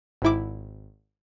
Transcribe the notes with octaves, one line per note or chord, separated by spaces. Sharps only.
G#1 G#2 E4 D6